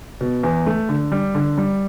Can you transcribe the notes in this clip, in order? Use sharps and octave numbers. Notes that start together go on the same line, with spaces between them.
B2
E2
A3
D3
G3
D3
G3